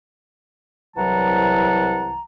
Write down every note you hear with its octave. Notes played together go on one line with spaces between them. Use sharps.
C2 E3 F#3 F#5 A5 A#5